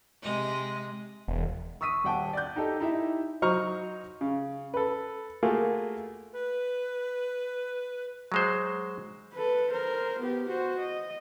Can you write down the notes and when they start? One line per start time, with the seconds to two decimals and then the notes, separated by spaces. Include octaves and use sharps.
0.22 C3 G#3 D#5
1.28 E1
1.81 C#6 D#6 E6 B6 D#7
2.04 D#1 F#5 G5 A5
2.33 D5 G6
2.56 D#4 G4 A4 D#5
2.80 D#4 E4 G4 E5
3.42 F#3 D#4 C5 A#5 C#6 F6
4.21 C#3
4.74 A4 B4
5.43 A3 A#3 F4 F#4 G#4 A#4
6.33 B4
8.32 F#3 G#3 C5
9.33 A4 B4
9.70 A#4 C5
10.19 B3 G4
10.48 F#4 C5
10.79 D#5